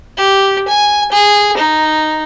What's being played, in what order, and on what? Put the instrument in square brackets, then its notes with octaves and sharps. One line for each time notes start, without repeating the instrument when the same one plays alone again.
[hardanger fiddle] G4
G#5
G#4
D#4